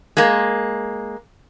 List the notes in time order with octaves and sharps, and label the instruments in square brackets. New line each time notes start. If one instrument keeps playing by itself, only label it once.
[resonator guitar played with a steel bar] G#3 A#3